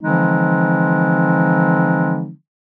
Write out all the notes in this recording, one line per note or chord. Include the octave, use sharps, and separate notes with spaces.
D3 E3 F3 G#3 C4 D#4